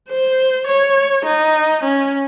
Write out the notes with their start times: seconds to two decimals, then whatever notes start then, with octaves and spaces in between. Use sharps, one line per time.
0.10 C5
0.68 C#5
1.26 D#4
1.84 C#4